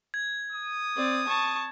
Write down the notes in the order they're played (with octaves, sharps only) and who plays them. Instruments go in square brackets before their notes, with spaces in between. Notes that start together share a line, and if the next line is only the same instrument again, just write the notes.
[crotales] G#6
[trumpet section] D#6
[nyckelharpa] C4 D5
A5 C#6